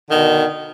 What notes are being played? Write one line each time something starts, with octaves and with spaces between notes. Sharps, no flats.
B2 D3 D#3